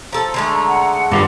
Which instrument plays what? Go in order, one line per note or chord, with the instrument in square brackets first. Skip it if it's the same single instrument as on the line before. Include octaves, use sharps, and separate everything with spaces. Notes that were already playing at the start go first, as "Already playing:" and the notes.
[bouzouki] F3 A4 [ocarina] A#5
[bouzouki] D3 G#3 A3
[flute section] F#5
[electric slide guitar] G2 F4 [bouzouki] G3 [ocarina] D6